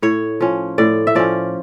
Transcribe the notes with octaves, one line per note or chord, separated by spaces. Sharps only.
A2 C#5
F3 C#4
A2 D5
E5
F3 C#4 D5